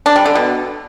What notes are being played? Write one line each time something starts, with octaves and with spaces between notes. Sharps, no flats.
D4
G3
D3
B2